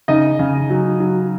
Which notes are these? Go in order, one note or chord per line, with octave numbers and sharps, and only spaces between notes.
C#3 D#4 D#5
C#3
F#3
F#3